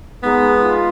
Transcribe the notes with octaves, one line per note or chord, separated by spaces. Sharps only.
G#3 B3 D#4
F4